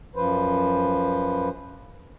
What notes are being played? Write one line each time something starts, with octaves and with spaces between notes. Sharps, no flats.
F#2 F3 B4 C5